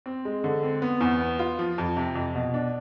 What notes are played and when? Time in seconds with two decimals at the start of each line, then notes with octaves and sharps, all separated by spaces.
0.06 C4
0.25 G#3
0.44 D3
0.63 C4
0.82 B3
1.01 E2
1.20 B3
1.39 F4
1.59 F3
1.78 F2
1.97 C3
2.15 F2
2.35 B2
2.54 D4